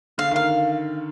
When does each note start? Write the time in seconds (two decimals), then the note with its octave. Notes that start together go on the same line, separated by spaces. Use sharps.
0.18 D3 F5
0.31 D#3
0.36 F5